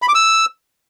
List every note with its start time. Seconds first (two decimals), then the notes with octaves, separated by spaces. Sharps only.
0.02 B5
0.09 D6
0.15 E6